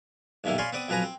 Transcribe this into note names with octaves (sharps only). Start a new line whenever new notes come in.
B1 G2 A#2 D#3 E4
C#5 D5 F5 G#5 B5 C6
B3 C4 D5 D6 D#6
F2 F3 F#3 B4 G#5 A#5
C4